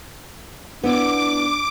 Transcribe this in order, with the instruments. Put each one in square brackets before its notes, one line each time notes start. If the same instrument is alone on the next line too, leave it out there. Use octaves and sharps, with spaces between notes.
[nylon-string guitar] B3 E4 [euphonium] D4 [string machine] D6